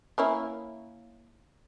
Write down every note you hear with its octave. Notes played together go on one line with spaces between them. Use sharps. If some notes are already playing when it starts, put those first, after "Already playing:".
A#3 C#4 E4